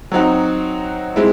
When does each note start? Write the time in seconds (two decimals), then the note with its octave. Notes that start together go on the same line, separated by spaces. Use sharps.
0.12 F#3 C4 D#4 F#4
1.16 G#3 C4 E4